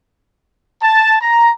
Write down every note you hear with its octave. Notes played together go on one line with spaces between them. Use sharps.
A5
A#5